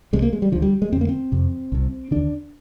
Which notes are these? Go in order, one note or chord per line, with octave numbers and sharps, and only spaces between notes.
C2 C3 G#3
A#3
G#3
G3
D2 D3 F3
G3
G#3
F2 D3 A#3 C4
C4
F2 C3
C2 C3
D#2 D3 D4